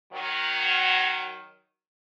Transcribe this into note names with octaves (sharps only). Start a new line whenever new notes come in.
D#3 F#3